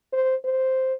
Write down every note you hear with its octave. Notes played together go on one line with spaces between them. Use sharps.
C5
C5